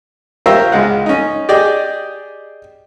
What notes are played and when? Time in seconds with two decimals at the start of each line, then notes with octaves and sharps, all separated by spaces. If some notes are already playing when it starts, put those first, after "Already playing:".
0.46 F4 G4 A#4 C5 C#5 E5
0.72 C#2 G#3 F4 F#5
1.06 C#4 D#4
1.49 G4 G#4 D5 D#5